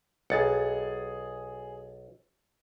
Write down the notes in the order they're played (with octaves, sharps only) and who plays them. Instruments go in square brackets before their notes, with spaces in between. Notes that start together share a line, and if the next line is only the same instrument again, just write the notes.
[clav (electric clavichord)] B1 [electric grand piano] G#4 A6 C#7